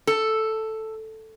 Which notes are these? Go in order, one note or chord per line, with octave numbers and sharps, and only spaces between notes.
A4